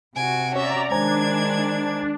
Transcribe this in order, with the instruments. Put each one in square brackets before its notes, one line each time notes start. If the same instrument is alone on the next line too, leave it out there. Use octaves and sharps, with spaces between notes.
[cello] C3 F#4 [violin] G#5 D7
[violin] C#4 E5 [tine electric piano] C#5 [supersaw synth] D5 A#5
[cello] D#3 G#3 [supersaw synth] D4 [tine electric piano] C5 G#5 A#5 [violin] G#6